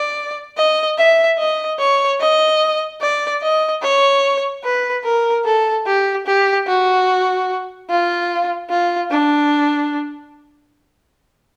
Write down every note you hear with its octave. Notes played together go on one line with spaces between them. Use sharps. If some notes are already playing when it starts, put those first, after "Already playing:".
Already playing: D5
D#5
E5
D#5
C#5
D#5
D5
D#5
C#5
B4
A#4
A4
G4
G4
F#4
F4
F4
D4